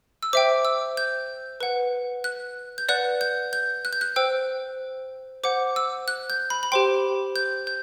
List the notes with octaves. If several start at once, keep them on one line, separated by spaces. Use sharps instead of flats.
E6
C5 E5 G5 D6
E6
G6
B4 F#5
F#6
G6
B4 D5 F#5 F#6
G6
G6
F#6
G6
F#6
C5 G5 E6
C5 F#5 D6
E6
F#6
G6
B5
B5
G4 C5 G5 C6
G6
G6